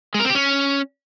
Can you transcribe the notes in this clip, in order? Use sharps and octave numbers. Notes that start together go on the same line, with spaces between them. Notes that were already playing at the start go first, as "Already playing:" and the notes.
G#3
A#4
C4
G4
C#4